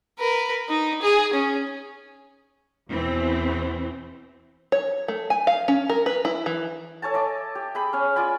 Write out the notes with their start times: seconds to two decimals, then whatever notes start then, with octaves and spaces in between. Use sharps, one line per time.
0.19 A#4 B4
0.69 D#4
1.02 G#4
1.33 C#4
2.90 E2 B2 E3 C4
4.72 C#5
5.08 A3
5.30 G#5
5.47 F5
5.68 C#4
5.89 A#4
6.06 B4
6.25 E4
6.46 E3
7.02 A4 C#5 G#5 A5
7.14 D#5 E5 D6
7.55 G4
7.75 G#4 G5 B5 D#6
7.93 C#4 C#5 G#5
8.16 F4 D5 G#5 B5